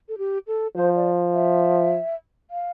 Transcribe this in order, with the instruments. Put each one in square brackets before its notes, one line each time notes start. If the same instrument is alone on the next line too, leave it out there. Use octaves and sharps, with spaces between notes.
[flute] A4
G4
A4
[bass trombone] F3 [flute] C5
[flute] D5
E5
F5